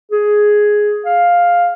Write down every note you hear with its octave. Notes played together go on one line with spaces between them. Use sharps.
G#4
F5